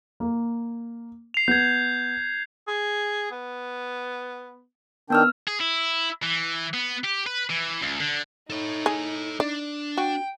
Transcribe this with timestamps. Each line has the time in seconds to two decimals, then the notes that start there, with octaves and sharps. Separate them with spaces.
0.20 A#3
1.34 C7 F7
1.48 B3 G6 G#6
2.68 G#4
3.32 B3
5.10 D#3 B3 D4 G5 E6 F6
5.48 G#4
5.61 E4
6.23 E3
6.73 B3
7.04 G4
7.26 B4
7.50 E3
7.81 C#2
8.00 D3
8.50 D#4 A4 C#5
8.86 G#4
9.40 D4 D5
9.97 F#4 G5